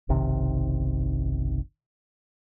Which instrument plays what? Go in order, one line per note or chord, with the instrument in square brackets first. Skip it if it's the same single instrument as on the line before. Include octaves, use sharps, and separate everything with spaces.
[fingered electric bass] F#1 B1 C3 D#3